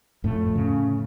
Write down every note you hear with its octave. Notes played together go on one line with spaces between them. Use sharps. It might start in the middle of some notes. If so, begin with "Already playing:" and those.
F2 A2 A3
C#3